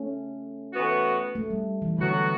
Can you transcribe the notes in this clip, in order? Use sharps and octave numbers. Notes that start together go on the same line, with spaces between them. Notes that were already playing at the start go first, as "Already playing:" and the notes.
Already playing: A3 C#4
A2 E3 B3 F#4
A3
G3
E3
A2 D3 F#3 B3 F#4